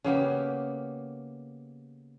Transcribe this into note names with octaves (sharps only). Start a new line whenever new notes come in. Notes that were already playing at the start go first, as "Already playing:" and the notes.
C#3 A#3 B3 G4